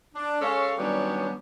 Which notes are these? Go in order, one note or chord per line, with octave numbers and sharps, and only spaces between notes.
D4
G#3 C#4 A4 C#5 F5
D#3 F#3 G3 B3 C#4 D4